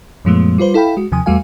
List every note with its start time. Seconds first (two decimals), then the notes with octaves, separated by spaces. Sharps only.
0.25 F#2 A#2 F3 G#3 A3 B3
0.58 G3 F4 B4 C5
0.74 E4 A4 F5 G5 B5
0.97 G#3 F#4
1.12 D#2 C3 F3 G#5 D#6
1.26 E2 G3 A3 F#4 F5 G#5